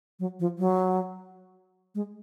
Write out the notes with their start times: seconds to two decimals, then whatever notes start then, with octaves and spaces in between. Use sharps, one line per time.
0.20 F#3
0.40 F3
0.59 F#3
1.95 G#3